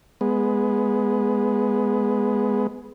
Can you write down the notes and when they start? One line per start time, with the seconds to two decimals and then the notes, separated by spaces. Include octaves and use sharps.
0.21 G#3 B3